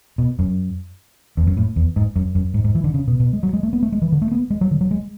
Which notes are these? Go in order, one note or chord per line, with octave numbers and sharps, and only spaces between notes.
B2
F#2
E2
F#2
A2
E2
G#2
F#2
F#2
G#2
G#2
E3
D3
C#3
B2
B2
G#3
F#3
G#3
A3
B3
A3
G#3
E3
D3
A3
B3
G#3
F#3
D3
F#3
G#3